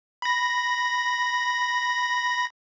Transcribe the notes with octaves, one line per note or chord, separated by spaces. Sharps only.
B5 A#6